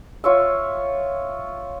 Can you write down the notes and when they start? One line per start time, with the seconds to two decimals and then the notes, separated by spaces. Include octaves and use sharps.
0.24 F4 C#5 E5